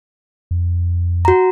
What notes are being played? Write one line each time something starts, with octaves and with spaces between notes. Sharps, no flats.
F2
F#4 A#5